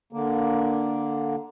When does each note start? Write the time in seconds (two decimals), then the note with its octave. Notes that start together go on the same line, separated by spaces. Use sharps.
0.13 D3 A#3